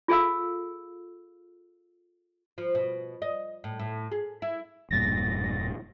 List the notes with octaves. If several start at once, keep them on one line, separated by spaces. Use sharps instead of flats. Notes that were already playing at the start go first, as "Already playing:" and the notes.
F4 G#4 A4 F5 E6
F3
B2
D#5
A2
A2
G#4
E4
E1 G2 A#2 A6 A#6